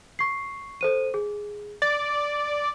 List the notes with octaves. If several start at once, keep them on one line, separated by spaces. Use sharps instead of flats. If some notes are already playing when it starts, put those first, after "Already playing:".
C#6 C7
A4 C5 D#7
G#4
D5 A6